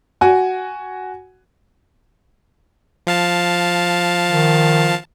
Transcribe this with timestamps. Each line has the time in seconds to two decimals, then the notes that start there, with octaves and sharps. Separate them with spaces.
0.21 F#4 G#5
3.07 F3 F5 A5
4.27 D#3